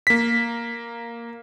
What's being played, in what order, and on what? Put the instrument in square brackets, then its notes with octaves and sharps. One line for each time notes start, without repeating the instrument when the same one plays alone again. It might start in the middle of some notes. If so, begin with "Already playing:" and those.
[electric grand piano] A#3 B6